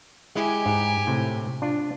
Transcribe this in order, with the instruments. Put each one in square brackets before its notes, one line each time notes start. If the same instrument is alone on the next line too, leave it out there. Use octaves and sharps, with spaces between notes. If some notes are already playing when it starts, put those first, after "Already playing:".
[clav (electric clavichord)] G#3 E4 [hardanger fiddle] G4 G#5
[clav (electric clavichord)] G#2
A2 C3
D4 F4